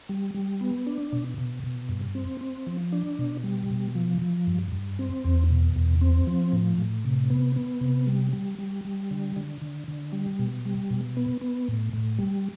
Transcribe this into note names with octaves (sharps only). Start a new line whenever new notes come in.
G3
G3
B3
D4
B2
B2
B2
G2
C4
C4
F3
D4
B2
G3
B2
F3
F3
G2
G2
C4
E2
B2
E2
C4
F3
A2
A2
C3
B3
B3
C3
G3
G3
G3
G3
D3
D3
D3
D3
G3
B2
G3
B2
B3
B3
A2
A2
G3